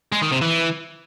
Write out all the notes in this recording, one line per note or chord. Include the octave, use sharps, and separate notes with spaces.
G#3
D#3
C3
E3